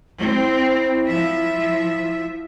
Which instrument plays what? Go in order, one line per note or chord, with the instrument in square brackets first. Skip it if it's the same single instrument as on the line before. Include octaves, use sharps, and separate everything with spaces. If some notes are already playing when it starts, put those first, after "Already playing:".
[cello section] C4 [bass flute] E4
[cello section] F3 E5